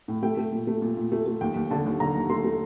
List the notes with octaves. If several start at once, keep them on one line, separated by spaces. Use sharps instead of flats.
A2
A3 G5
A3
A#2
A3
A#2
A#2
A3
A3
D#2 G5
D#2
D3 A5
D#2
D3 A#5
D#2
A3 C6
A3